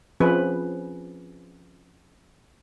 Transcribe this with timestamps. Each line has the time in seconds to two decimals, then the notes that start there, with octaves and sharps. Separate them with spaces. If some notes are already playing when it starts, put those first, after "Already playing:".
0.20 F3 C4 C#4 G#4 B4